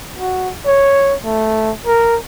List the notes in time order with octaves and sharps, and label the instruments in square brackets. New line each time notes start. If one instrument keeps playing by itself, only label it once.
[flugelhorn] F#4
C#5
A3
A#4